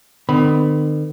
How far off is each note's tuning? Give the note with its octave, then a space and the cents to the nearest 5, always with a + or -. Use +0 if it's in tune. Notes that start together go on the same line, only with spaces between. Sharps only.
D#3 -45 B3 +45 B5 +5